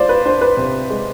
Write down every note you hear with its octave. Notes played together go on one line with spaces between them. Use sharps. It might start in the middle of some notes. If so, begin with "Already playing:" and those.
Already playing: G#3 F4 C5 D5
B4
D4 C5
B4
C3
G#3